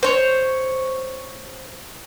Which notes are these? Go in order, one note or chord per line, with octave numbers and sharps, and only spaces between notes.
C5 C#5